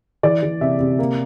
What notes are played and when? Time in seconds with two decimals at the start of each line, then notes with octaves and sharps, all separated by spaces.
0.23 E3 D5
0.43 E3
0.61 C3 E5
0.80 C3
0.99 A#3